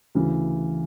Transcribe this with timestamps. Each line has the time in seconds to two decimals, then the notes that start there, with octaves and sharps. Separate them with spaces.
0.15 D2 C#3 E3